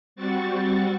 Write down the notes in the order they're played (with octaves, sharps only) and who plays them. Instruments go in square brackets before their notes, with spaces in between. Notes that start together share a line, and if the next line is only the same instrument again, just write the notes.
[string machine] G3 C4 F#4 C#6 A6